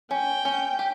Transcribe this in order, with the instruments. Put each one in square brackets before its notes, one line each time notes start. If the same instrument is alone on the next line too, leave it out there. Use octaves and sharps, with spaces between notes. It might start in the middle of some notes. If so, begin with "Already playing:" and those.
[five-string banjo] C#4 [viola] G5
[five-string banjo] C#4
G4